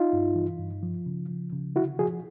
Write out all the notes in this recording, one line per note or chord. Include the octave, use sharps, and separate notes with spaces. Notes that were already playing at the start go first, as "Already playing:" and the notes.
Already playing: D#4 F4
G2
E3
G2
F3
C#3
F3
C#3
D3 E4 F#4
F3 F#4 G#4